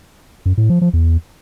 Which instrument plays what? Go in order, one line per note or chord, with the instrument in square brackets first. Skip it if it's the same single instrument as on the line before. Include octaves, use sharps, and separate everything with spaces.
[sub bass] F#2
A2
F3
F3
E2